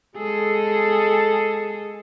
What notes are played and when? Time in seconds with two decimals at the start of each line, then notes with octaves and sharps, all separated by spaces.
0.16 G#3 G#4 A4